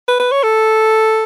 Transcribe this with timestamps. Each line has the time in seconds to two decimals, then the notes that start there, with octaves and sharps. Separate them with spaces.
0.08 B4
0.20 B4
0.32 C#5
0.43 A4